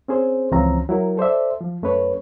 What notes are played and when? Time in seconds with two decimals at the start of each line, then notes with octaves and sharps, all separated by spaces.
0.08 C4 C#4 G#4 C5
0.52 C#2 E3 F3 C4 C#4 A#5
0.89 F#3 E4 A#4
1.17 A4 C5 D5 E5
1.61 F3
1.82 F#2 A3 C#4 B4 C#5